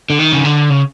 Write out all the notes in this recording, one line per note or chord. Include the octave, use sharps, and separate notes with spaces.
D3
D#3
C#3
D3
C#3